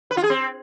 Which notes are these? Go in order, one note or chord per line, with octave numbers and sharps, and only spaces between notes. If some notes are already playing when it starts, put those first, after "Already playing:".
B4
F4
G#4
C4